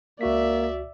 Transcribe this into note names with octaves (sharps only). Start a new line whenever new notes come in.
C#2 A#3 F#4 D5 E5 B6